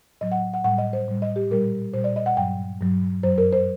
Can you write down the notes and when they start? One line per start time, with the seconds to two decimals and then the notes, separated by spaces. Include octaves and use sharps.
0.21 A2 F#3 D#5
0.32 F#5
0.54 F#5
0.64 A2 G3 F#5
0.78 D#5
0.93 C5
1.08 A2 G3
1.22 D#5
1.36 G4
1.50 A#2 G3 A#4
1.93 A#2 G3 C5
2.04 D5
2.16 D#5
2.26 F#5
2.37 G2 F#3 G5
2.81 G2 F#3
3.23 F#2 F#3 C5
3.38 A#4
3.53 C5